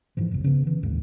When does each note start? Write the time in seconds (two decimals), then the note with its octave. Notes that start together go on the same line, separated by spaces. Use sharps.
0.17 G#2 E3 F3
0.31 F#1 C2
0.44 C#3 B3
0.63 D3 E3
0.83 A#1 D#2 G#2 D#3